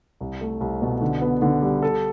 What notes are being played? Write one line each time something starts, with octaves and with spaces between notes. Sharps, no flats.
C2
A3
C2
B2
D3
B3
D3
G3
A4